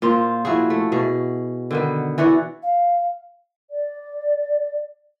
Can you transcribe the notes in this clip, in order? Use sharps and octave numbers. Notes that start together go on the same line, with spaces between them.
A#2 F4 C5
F3 E4 F#4 G#4
A3
B2 G#4
D3 D#3 B3
E3 F#4 D5 F#5
F5
D5